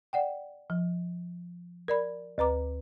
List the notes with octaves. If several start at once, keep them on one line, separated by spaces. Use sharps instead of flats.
D5 F#5 G5
F3
A#4 D5 B5
D2 B4 A#5 D6